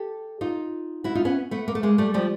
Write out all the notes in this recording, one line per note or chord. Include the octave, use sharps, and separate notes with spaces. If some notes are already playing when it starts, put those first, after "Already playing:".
Already playing: G4 A4
D#4 F4
E4 F#4
D#4 F4
B3 C#4
A3 B3
A#3
A3
G#3 A#3
G3 A3
F3 G3